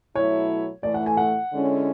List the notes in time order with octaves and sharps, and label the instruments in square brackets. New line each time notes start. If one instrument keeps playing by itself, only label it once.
[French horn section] B2 F#3 A3 E4 [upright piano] C#5
[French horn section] A2 E3 A3 [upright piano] D5
[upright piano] F#5
G#5
F#5
[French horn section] D3 G#3 C#4 E4